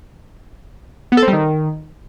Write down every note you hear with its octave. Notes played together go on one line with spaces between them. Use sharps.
B3
A4
C4
G3
D#3